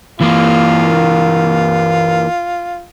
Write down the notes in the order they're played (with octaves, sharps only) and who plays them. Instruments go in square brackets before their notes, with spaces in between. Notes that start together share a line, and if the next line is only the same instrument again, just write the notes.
[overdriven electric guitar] E3 A#3 [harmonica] F4